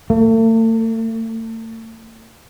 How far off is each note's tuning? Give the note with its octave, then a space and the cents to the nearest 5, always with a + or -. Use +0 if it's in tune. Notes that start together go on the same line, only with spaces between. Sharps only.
A3 +40